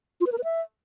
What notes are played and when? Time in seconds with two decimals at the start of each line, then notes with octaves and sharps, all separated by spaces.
0.21 F4
0.27 B4
0.32 A#4
0.38 B4
0.44 E5